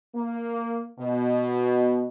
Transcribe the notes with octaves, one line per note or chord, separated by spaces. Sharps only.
A#3
B2